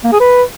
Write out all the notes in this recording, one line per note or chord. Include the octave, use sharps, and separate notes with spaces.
A#3
G#4
B4